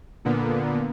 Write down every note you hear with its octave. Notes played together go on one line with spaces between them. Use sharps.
A#2 D3 A#3 B3